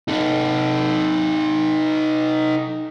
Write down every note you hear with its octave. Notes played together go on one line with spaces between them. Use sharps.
D#4 A4